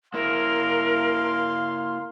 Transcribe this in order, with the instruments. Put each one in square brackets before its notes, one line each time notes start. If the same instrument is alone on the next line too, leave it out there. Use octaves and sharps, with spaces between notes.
[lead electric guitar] A#3 E4 [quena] A#4 [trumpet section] F5 C6